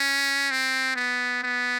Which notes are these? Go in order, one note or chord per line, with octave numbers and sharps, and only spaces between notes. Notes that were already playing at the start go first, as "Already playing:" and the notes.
Already playing: C#4
C4
B3
B3